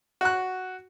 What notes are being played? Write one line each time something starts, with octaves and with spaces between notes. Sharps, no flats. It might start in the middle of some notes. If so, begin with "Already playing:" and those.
F#4 F#6